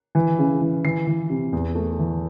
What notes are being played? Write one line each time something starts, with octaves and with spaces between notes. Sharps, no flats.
E3
C#3
E3
E3 C7
E3
C3
E2
A3
E3